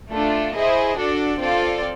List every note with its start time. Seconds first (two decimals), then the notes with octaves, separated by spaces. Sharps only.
0.12 A3 D4 F4 A4
0.55 E4 G#4 C5 D#5
0.97 D4 F#4 A4 D5
1.40 C4 F4 A4 D5 F5